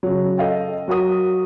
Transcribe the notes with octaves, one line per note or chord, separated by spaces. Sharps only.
C#3 F#3
A4 D#5 F5 G5
F#3 F#4 A#4 D#6